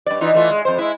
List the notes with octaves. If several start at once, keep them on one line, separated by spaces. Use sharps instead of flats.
G2 D5
E3 D#4 F4
E3 A3 F4
G#3
F2 C5
G#3 E4